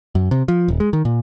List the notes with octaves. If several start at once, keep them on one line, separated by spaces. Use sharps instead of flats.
F#2
C3
F3
D#1
G#3
D#3
A#2